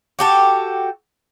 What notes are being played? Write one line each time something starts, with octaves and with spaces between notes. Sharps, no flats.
F#4 G4 A4